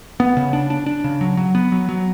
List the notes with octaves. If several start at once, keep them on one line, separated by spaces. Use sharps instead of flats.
B3
C#3
D4
D4
D4
C#3
F#3
F#3
B3
F#3
F#3